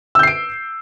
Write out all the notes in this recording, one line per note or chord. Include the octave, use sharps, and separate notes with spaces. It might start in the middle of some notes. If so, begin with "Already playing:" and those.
E6 G6 C7 D7